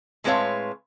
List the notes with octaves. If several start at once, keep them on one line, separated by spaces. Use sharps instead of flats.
A2 G#3 C4 B4 C#5 F5